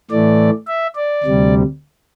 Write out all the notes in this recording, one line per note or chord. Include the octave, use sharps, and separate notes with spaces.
A2 E3 A3 D5
E5
D5
D2 C3 G3